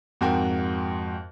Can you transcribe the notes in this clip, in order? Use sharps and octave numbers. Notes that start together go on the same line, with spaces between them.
F2 G#2 F#4 A#4 G5